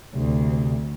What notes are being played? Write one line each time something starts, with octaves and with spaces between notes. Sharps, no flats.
D2 C3